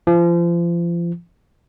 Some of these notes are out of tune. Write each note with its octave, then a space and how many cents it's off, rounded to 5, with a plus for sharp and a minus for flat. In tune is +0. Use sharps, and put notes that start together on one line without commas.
F3 -35